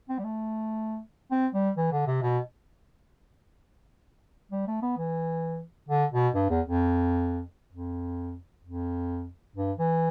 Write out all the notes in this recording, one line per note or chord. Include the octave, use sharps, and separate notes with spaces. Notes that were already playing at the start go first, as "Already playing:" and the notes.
C4
G3
A3
C4
G3
E3
D3
C3
B2
G3
A3
B3
E3
D3
B2
G2
E2
F2
F2
F2
G2
E3